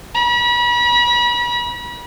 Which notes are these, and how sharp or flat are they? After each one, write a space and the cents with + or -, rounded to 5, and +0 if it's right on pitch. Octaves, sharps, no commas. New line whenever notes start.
B5 -35